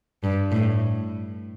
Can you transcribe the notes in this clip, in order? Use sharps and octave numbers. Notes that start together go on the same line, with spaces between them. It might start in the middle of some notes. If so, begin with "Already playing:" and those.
G2
A2